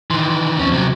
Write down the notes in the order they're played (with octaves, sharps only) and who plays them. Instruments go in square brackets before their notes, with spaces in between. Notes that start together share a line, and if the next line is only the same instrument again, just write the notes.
[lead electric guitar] D#3 E3 [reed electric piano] C6
[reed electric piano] D#2 F3 C4 [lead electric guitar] C#4 E4
[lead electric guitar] C3 F#3